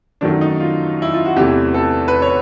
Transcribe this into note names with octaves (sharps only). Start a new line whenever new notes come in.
F#2 D#3 F#3 A3 D4
D#4
F4
E4
F4
F#4
E2 C3 E3 A3 G4
A4
B4
C#5